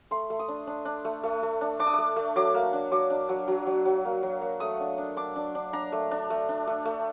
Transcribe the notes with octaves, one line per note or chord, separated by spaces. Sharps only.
A3 C6
A3
D#6
D4
D4
D4
A3
A3
A3
D4
D4 D6
D#6
A3 D6
A3
F#3 D6
A#3
D4
F#3 D6
D4
F#3
F#3
F#3
F#3
A#3
F#3
A#3
A3 D#6
D4
D4
D4 D6
D4
D4
D4 A#5
A3
D4
A3
D4
A3
A3